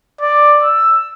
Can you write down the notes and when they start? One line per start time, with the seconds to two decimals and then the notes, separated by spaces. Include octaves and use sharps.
0.21 D5
0.63 E6